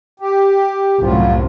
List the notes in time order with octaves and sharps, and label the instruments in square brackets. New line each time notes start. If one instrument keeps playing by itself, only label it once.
[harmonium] G4
[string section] C2 F#2 A2 [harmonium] F#3 F4